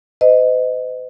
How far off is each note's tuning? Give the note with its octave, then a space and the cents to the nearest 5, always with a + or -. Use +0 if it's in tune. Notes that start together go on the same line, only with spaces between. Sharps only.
C5 -45 D#5 +0